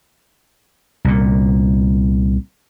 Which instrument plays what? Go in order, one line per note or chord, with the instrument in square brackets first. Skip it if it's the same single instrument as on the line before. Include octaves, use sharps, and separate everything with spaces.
[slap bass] C2 A#2